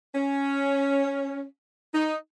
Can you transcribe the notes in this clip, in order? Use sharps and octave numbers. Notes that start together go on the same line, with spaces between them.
C#4
D#4